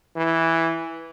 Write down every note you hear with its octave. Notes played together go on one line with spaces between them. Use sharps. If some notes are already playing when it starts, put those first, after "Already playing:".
E3